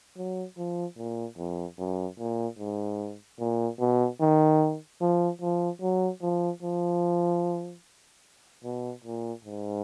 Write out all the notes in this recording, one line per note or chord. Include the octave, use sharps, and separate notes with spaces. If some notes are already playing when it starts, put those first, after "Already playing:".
F#3
F3
A#2
F2
F#2
A#2
G#2
A#2
B2
D#3
F3
F3
F#3
F3
F3
B2
A#2
G#2